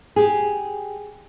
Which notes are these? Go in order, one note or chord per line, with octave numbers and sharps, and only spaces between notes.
G4 G#4